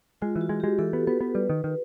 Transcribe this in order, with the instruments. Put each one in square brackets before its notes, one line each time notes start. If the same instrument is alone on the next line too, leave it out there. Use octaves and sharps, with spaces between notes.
[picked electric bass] G#3 [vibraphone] F4
[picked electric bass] E3
[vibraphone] F#4
[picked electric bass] G#3
[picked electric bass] G#3 [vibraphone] G4
[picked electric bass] E3 [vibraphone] A4
[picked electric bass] B3
[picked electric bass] B3 [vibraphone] B4
[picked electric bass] B3
[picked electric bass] G3 [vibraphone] B4
[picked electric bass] D#3
D#3